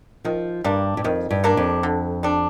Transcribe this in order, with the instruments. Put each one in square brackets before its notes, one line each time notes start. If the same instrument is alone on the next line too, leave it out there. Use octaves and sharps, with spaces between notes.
[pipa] D#3 [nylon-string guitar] F3
[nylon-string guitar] G2 [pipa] G3 A#3 D4
[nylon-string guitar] G2
[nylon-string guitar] F2 [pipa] D#3
[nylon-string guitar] G2
[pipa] G3 A#3 D4
[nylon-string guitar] F2
[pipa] D3
G3 D4